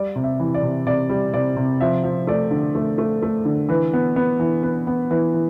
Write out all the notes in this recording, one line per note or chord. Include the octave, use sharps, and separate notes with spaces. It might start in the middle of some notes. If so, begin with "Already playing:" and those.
Already playing: G3 D5
C3
E5
E3
D5
C3
C3 D5
G3
C3 D5
C3
F3 E5
F3
A3 D5
D3
A3
A3
A3
D3
E3 B4
B3
B3
E3
B3 B4
B3
E3 B4
E3